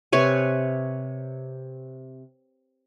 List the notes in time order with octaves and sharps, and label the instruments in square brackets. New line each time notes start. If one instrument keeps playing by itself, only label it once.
[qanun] C3 B4 C#5 G#5